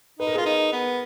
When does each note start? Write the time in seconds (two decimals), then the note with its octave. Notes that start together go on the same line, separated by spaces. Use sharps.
0.19 D#4 B4
0.27 A#4
0.35 F4 G#4 B4
0.46 D#4
0.73 B3